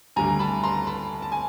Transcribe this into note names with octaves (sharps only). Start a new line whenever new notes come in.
D2 D3 G3 G#5 A#5
A5 B5
A#5 C6
A5 B5
A5
G#5